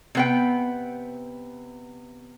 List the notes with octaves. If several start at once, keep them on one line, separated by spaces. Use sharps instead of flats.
C3 B3 G5